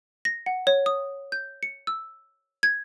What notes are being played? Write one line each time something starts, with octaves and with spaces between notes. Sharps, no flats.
A#6
F#5
C#5
D#6
G6
C#7
E6
G#6